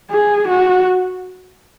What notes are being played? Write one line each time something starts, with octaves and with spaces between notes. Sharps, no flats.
G#4
F#4